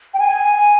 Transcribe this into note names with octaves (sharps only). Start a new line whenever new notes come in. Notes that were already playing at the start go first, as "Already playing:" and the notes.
G5
G#5